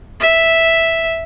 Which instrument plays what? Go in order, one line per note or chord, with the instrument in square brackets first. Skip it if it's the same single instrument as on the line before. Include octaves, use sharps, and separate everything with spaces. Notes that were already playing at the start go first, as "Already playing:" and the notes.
[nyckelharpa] E5